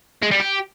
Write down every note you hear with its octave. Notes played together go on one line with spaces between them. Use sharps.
G#3
G3
G4